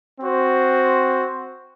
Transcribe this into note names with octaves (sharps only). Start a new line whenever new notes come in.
C4 F#4 C5